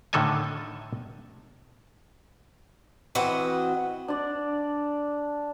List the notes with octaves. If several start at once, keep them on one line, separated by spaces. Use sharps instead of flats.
A2 D3 D#3 A4 D#5 G#5
E3 C4 F#4 B4 D#5 F#5
D4 D5